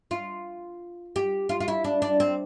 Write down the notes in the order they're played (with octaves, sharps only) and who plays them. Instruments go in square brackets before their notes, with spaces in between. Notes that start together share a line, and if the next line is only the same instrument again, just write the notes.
[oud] F4
G4
F4
F4
E4
D4
D4
C4